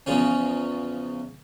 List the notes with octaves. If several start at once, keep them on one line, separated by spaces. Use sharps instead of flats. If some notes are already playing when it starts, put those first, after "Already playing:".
E2 C#3 F3 C#4